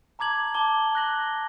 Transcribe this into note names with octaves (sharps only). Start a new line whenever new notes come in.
A5 A#5 D6 G#6 F#7
A5 D6 G7
F#6 A#6 F#7 G7